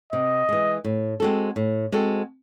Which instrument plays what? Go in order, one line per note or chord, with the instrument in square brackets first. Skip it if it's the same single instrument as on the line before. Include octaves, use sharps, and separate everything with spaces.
[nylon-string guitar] C3 [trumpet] D#5
[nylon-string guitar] E3 G#3
A2
G#3 C4 F#4 A4
A2
G#3 C4 F#4 A4